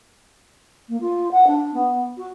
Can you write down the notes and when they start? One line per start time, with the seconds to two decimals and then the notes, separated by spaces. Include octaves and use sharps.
0.88 A#3
1.00 F4
1.31 F#5
1.47 D4
1.73 B3
2.17 F#4